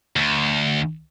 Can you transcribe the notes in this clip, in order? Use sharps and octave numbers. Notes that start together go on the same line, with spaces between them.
D2